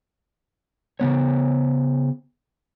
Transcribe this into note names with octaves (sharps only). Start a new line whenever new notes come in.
C#3 E3 B3 C#5